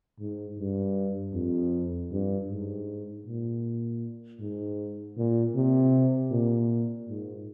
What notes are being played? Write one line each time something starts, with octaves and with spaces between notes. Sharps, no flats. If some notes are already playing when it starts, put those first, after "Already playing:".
G#2
G2
F2
G2
G#2
A#2
G#2
A#2
C3
A#2
G#2